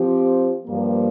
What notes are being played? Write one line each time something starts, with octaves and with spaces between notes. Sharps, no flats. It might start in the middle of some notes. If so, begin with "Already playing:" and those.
Already playing: F3 C4 G4
G2 F3 A#3